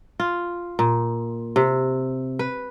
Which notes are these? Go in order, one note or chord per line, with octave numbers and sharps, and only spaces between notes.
F4
A#2
C3
B4